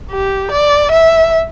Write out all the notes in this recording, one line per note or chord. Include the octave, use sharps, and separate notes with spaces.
G4
D5
E5